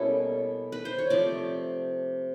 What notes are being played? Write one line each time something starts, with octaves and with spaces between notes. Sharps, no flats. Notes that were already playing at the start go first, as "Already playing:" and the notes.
Already playing: B2 G3 A#3 C#4 E4 A4
B4
C5
C#5
C3 F3 A3 D5